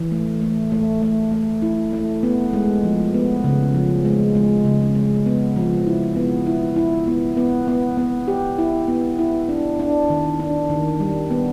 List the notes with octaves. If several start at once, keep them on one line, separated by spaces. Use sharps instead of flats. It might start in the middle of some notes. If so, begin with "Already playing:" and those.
Already playing: E3
A3
A3
A3
A3
A3
E4
A3
B3
G#3
F3
B3
C#3
F3
G#3
G#3
C#3
G#3
B3
F3
E4
B3
E4
E4
B3
B3
B3
B3
G4
E4
B3
E4
D4
D4
D#3
D4
D#3
G3
B3